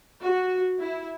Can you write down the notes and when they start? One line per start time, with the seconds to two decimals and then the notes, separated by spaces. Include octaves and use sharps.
0.21 F#4
0.79 E4